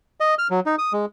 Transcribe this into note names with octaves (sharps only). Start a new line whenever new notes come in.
D#5
F6
F#3
D#4
D#6
G#3